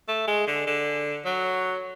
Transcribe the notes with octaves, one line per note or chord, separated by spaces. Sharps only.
A3
G#3
D3
D3
F#3